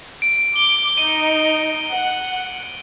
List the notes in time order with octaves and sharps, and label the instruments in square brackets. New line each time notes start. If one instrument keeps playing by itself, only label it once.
[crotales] D7
[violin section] D6 [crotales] G7
[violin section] D#4 [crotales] D#7
[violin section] F#5